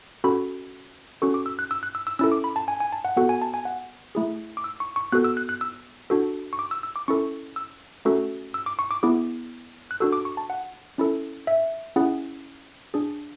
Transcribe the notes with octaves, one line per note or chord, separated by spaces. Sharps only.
C#4 F#4 A4 B5
C#4 F#4 A4 C#6
D6
E6
F#6
E6
F#6
E6
E6
C#4 E4 A4 E6
D6
B5
A5
G#5
G#5
A5
F#5
B3 F#4 A4 F#5
G#5
A5
G#5
F#5
A3 E4 G#4
D6
E6
C#6
C#6
B3 F#4 A4 F#6
E6
F#6
F#6
E6
D4 F#4 A4
C#6
D6
E6
E6
D6
C#4 E4 A4 C#6
E6
A3 C#4 F#4 A4
E6
D6
C#6
D6
B3 E4 G#4 D6
F#6
D4 F#4 A4 E6
D6
C#6
A5
F#5
C#4 E4 A4
E5
C#4 E4 G#4 F#5
D4 G#4